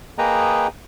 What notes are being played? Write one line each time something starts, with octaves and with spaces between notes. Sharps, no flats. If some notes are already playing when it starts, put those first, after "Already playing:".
A#3 G#4 B4 D#5 G5 A#5